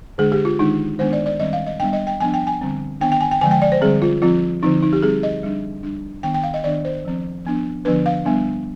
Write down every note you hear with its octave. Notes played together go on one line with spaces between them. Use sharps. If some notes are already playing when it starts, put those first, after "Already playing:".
D3 G#3 D4 G#4
G4
F4
D#3 G#3 D4 D#4
D#3 G#3 B3 D4 C5
D5
D5
D#3 G3 C4 D#5
F5
D#5
G3 B3 D4 G5
D#5
G5
F3 B3 D4 G#5
G5
G#5
D3 G3 C4
D#3 B3 D4 G5
G5
G#5
G5
D3 F3 G#3 G#5
G5
D5
C5
D3 G3 C4 G#4
F4
F3 C4 F4
D3 F3 C4 D#4
D#4
G4
G3 C4 G#4
D#5
G3 D4
G3 D4
D#3 B3 D4 G5
G5
F5
D#5
D#3 B3 D4 D5
C5
F3 C4
F3 B3 D4
D3 F3 B3 D4 B4
F5
G3 B3 D4